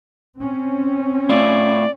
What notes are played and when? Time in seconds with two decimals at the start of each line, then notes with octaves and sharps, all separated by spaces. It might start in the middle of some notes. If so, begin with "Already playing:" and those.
0.39 C4 C#4
1.29 A2 E4 F4 D5